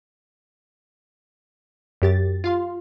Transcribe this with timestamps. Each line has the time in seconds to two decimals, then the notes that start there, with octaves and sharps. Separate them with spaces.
2.02 F#2 G4 A6
2.44 F4 F5 C6